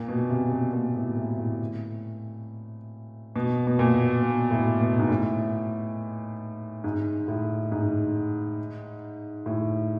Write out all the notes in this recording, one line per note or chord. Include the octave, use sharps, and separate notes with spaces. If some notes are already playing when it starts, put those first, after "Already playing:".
Already playing: A#2
B2
C3
B2
A#2
A2
A2
A2
B2
B2
A#2
B2
A2
B2
G#2
A2
G#2
A2
G#2
A2